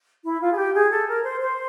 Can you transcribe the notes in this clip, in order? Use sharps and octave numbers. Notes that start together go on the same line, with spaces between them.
E4
F4
G#4
G4
G#4
A4
A#4
C5
C5